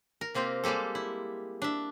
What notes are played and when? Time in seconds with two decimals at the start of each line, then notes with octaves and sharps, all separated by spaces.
0.21 A#4
0.34 C3 A#3 C4 F4 G4
0.64 G3 G#3 A#3 G4 A4
0.95 E4
1.62 D4 E5